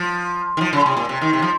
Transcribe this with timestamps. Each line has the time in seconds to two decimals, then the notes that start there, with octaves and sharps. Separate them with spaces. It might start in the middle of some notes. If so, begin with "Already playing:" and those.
Already playing: F3
0.57 D#3
0.61 F3
0.73 C#3
0.86 C3
0.97 A#2
1.09 C3
1.21 D#3
1.33 C3
1.42 F3